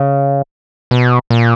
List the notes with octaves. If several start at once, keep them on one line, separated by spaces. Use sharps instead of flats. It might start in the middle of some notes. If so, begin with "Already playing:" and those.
Already playing: C#3
B2
A#2